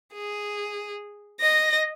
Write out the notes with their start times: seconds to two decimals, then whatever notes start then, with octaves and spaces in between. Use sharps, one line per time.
0.14 G#4
1.41 D#5 A#6